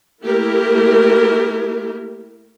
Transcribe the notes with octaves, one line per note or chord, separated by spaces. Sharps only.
A3 A#3 E4 G4 A#4